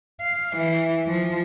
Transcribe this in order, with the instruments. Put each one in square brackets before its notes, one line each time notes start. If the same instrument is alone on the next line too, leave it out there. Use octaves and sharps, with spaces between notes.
[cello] F5
E3
F3